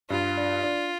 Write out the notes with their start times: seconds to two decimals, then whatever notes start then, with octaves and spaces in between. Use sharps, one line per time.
0.10 G2 F4
0.37 D4
0.63 D4